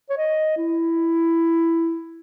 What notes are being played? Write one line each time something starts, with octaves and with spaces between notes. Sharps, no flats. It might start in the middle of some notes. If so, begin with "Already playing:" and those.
C#5
D#5
E4